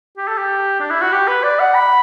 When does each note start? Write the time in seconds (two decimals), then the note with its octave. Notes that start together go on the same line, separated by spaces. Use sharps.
0.17 G4
0.28 A4
0.38 G4
0.80 D4
0.90 E4
1.01 F#4
1.12 G4
1.28 B4
1.43 D5
1.60 F#5
1.75 B5